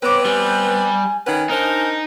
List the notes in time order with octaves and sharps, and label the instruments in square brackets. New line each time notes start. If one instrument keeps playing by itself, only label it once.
[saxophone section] B3 C4 B4 [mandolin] G4 D#5 D6 [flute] C#5
[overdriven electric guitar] G3 [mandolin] G4 [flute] G#5
[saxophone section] D#3 C#4 B4 [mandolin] F#5 [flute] G#5
[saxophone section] D4 A#4 C5 [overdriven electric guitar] D#4